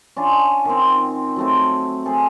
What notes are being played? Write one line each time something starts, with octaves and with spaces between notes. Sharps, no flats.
C#4 D4 F4
D#3 C4
F#3 A3 C4
C4 G#4 A4